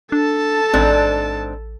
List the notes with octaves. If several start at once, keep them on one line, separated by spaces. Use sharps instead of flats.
D4 A4 A5
A1 G#2 C4 D4